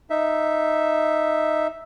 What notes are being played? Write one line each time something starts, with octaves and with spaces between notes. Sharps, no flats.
D#4 E5